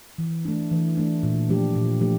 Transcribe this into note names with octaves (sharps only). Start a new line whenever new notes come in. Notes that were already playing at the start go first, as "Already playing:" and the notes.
E3
A3 D4
E3
A3 D4
A#2
F3 A3 D4 G4
A#2
F3 A3 D4 G4